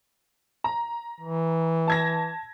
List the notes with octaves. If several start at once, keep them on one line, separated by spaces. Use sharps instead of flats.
A#5
E3
A5 G#6 A#6